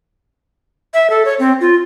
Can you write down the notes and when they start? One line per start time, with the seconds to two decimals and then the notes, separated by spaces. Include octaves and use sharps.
0.94 E5
1.10 A4
1.25 C#5
1.39 C4
1.61 F4